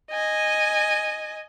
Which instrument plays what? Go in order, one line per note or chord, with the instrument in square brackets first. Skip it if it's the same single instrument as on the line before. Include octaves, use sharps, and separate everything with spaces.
[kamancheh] D#5 G#5